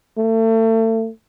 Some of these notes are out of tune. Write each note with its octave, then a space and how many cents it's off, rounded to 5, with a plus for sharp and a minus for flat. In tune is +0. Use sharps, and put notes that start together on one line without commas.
A3 +35